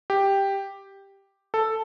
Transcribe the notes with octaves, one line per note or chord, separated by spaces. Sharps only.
G4
A4